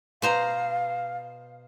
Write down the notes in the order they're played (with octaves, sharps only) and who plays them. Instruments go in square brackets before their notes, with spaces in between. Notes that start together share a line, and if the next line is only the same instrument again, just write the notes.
[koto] B2 C5 A#5 [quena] F5